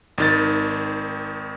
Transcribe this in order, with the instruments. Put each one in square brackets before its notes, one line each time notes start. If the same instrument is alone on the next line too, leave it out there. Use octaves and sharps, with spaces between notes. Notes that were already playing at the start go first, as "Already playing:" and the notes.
[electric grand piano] G#1 D#3 A6